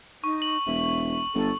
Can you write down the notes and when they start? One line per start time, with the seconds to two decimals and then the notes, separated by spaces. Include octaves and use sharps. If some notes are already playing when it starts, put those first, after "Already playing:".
0.24 D#4 C#6
0.42 F#7
0.66 E1 E5
1.35 G1 A4